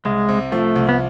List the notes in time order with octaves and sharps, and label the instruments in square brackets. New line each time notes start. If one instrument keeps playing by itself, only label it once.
[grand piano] C2 [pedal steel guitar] G#3
[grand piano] C3
[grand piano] F3 [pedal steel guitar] A3
[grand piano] C2
[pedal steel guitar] B3